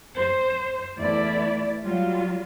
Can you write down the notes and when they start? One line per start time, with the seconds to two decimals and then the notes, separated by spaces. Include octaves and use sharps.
0.18 C5
0.99 E2 A3 E4 D5
1.83 F#3 G3 F4